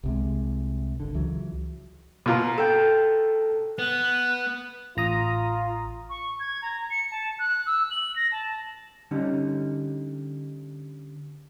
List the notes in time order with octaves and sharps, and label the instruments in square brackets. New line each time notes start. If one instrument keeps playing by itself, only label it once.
[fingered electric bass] C2 C3 G#3
G#1 D3
C#2 E3 F#3
[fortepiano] B2 F4 A#4
[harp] A4 G5
[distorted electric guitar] B3 [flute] F#6
[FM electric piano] A1 A#5 D#6 [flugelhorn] F4
[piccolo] C#6
G#6
A#5
C#7
A5
F#6
E6
F#7
A#6
A5
[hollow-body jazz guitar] D3 G3 C#4 D#4